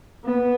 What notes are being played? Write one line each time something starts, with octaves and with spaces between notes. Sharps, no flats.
B3